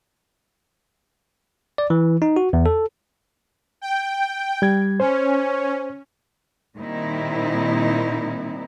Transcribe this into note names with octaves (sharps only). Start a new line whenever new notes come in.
D5
E3
D#4
F#4
E2
A4
G5
G3 G#6
C#4 C5
A#2 D#3 G3 C4 D#4 E4